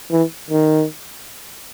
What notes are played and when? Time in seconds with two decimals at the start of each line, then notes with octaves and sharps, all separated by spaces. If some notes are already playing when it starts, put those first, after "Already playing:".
0.12 E3
0.50 D#3